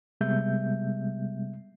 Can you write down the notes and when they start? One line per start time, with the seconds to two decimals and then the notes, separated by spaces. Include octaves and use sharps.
0.21 C3 G3 G#3 B3 E5 G6